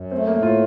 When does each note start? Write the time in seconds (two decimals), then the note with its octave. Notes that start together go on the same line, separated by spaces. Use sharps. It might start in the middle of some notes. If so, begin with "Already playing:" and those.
Already playing: F#2
0.11 A3 C4
0.27 A#3
0.36 A2
0.43 F4